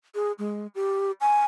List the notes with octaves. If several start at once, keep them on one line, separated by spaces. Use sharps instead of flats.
G#4
G#3
G4
G#5